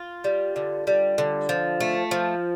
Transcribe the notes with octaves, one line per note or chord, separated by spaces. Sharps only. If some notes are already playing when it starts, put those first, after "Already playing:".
Already playing: F4
G3
D3
G3
D3
F3
A3
F3